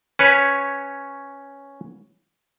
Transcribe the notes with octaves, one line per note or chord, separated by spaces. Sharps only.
C#4 B4 C#5